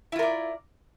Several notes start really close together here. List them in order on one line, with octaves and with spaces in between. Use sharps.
E4 F4 A#4 D5